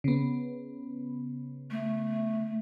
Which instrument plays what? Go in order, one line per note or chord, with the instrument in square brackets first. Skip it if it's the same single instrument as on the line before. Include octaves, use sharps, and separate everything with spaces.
[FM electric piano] C#3 B3
[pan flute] A3